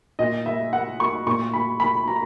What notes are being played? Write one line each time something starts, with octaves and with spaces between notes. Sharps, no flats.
A#2 D#5
E5
F#5
C#6
A#2 C#6
B5
B5
A#5